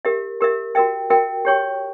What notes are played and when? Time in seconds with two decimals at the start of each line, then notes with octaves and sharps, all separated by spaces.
0.05 G4 A#4 E5
0.41 G4 A#4 E5
0.75 F#4 A#4 E5 G5
1.10 F#4 A#4 E5 G5
1.45 G4 C#5 G5 C#6